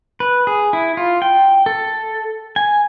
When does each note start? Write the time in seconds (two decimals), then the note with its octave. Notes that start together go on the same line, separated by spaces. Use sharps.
0.20 B4
0.47 G#4
0.73 E4
0.97 F4
1.22 G5
1.66 A4
2.56 G#5